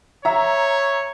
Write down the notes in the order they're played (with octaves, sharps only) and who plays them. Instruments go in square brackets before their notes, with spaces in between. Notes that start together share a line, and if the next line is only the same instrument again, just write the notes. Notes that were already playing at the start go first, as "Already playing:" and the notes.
[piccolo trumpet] C#5 [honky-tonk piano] E5 A#5